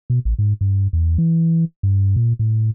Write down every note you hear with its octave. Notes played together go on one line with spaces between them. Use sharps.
B2
A1
G#2
G2
E2
E3
G2
A#2
A2